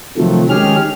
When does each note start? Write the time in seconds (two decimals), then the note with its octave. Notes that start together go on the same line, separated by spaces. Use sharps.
0.17 C3 D#3 F3 F#3 A3
0.50 D#3 G#3 C#4 G4 G#4 F6